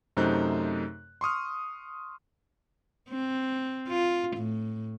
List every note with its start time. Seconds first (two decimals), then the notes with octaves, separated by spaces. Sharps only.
0.17 F#2 C3 A3 D#4 C5 F#6
1.21 C6 C#6 D#6 F6
3.10 C4
3.88 F4
4.37 A2